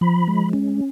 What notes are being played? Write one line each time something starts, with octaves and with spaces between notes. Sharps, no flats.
F3 B5
G#3
C#4